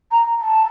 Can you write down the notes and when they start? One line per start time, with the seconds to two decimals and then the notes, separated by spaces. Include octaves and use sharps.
0.11 A#5
0.41 A5